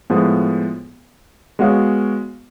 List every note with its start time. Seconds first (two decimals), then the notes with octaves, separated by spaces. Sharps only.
0.10 A2 F3 G#3 B3
1.59 G#3 B3 F#4 C#5 F5